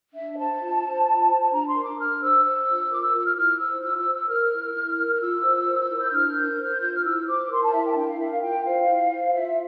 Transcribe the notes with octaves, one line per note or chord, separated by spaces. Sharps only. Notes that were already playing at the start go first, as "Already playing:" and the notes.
D4 E5
C5 A5
F4
C5
F4
C5
A5
D4 A#5
C6
A#4
D6
D4 F6
C5 E6
C5 E6
F4
A#4 D6
E6
F4
E6
F6
E4 F6
C5 E6
F4 E6
E6
C5
E6
A#4 F6
E4
E4
A#4
F6
F4 E6
C5
A#4
E4
G6
D4 F6
A#4 G6
C5 F6
G6
F4 G6
F6
E4 E6
C5 D6
A#4 C6
A5
E4 E5
G5
A5
D4 G5
F5
A#4 E5
F5
F4 G5
C5 F5
E4
C5
F4 E5